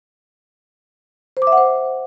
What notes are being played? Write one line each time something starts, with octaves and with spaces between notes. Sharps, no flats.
C5
D6
E5
F#5
C5